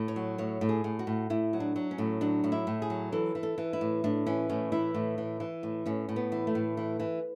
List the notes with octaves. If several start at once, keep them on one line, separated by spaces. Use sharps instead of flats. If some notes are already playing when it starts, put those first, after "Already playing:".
Already playing: A2
C#5
F#3
A2 C#5
A2
G#4
A2
F#4
A2
A2 E4
F#3
D4
F#3
C#4
A2
F#3 D4
A2
E4
A2
G#4
F#3
E3 A4
E3
A4
E3
E4
A2
A2 D4
E3 C#4
A2 C#4
E3 E4
A2
E3
E3
A2
A2 C#4
A2
B3
E3
A3
A2
E3
E3